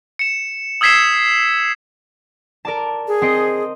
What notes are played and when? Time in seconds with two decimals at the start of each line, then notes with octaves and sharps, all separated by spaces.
0.19 C#7 E7
0.81 D#6 E6 G#6 B6 C7 E7
2.65 A#4 D5 A5
3.08 G#4
3.22 C4 D#5 C7